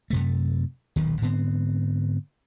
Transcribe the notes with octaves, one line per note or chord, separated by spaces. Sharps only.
F#2 C3 A3
D#1 B1 D#3
G#2 D3 B3 C4